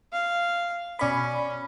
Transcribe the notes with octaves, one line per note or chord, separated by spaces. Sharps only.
F5
B2 C#4 D5 B5